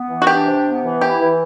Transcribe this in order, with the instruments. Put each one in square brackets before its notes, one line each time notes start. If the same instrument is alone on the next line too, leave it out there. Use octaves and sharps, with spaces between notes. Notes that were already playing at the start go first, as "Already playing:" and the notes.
Already playing: [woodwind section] B3
E3
[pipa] F#4
[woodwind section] D4 [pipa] G4
[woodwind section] C3
B3
E3
[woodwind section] E4 [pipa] G4
[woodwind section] E3